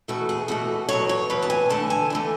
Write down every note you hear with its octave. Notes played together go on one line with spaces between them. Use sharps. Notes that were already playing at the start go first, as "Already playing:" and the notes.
E2 B2 A3 F#4
G#4
E2 B2 A3 F#4
E2 B2 F#3 C#5
C#5
E2 B2 F#3 B4
A5
G#5
E2 D3 A3 A5
G#5
E2 D3 A3